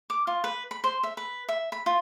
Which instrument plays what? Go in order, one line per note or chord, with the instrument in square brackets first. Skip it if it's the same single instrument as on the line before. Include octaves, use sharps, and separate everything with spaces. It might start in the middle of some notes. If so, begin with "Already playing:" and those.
[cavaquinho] D6
F4
B4
B5
C5
E5
B4
E5
B5
F4